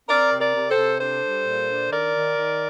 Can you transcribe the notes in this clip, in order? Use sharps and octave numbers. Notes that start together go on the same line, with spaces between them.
C4 A#4 D5
C3
A#4 D5
C3
A4 C5
C3
D4 A4 C5
G3
A#2
D4
D#3 A#4 D5
D#3
D#3